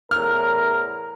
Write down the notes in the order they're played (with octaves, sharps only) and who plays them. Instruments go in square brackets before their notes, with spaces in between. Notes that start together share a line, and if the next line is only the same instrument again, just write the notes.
[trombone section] E2 A2 A#4 [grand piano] F6